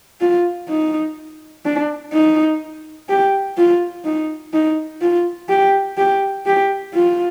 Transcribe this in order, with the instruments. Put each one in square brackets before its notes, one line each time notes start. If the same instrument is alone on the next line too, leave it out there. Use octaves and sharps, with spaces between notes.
[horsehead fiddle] F4
D#4
D4
D#4
G4
F4
D#4
D#4
F4
G4
G4
G4
F4